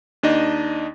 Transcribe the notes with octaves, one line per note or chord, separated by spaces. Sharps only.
D#2 D4 D#4 D#5